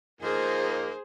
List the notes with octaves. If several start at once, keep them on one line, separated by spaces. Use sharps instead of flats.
F3 A#3 D#4 G#4 C5